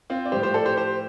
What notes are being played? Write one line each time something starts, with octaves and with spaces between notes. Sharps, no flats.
C4 F4
D5
A2 F3 G4 C5
G4 C5
A4 D5
G4 C5
G4 C5